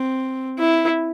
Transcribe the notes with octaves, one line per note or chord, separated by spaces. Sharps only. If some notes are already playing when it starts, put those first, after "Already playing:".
Already playing: C4
E4